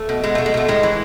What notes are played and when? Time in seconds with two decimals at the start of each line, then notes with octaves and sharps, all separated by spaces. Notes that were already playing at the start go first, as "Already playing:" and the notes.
Already playing: A3
0.09 B2
0.23 B2 G#3
0.35 B2 A3
0.46 G#3
0.54 B2 A3
0.68 A2 G#3
0.83 E3